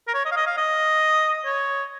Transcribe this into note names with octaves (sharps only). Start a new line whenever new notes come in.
A#4
C#5
D#5
F5
D#5
F5
D#5
C#5